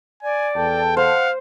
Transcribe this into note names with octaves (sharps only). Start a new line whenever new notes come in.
D5 G#5
E2 A4 G5 A5
C5 F5 F#5